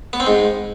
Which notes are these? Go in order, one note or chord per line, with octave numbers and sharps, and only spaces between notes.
B3
C4
G#2